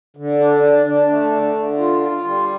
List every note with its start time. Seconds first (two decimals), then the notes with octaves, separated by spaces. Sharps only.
0.17 D3
0.40 D4
0.63 D4
0.86 D4
1.09 A3
1.32 D3
1.55 D3
1.78 F4
2.01 F4
2.24 G3